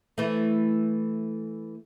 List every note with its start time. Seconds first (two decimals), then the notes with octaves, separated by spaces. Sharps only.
0.18 E3 A3